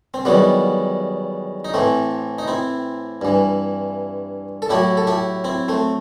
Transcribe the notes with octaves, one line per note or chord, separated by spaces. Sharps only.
C4
E2 D#3 F#3 G3 B3
D#4
A2 E3 A3 C4
D#4
C4 E4
G2 E3
A4
A2 F#3 E4 G4
A4
E4 G4
C4 E4
A3 C4